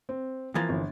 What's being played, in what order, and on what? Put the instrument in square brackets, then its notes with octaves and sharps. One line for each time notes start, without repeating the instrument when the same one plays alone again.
[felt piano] C4
[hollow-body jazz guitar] E3 F3 A#3 [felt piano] G#6 A6
[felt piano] G1